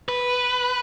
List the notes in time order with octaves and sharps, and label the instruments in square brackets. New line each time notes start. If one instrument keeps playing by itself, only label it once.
[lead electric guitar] B4